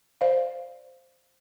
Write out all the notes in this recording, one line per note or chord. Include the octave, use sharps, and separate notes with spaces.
C5 D5 F5